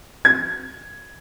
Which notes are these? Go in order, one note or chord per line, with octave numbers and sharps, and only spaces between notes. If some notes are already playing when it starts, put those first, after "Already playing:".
G#6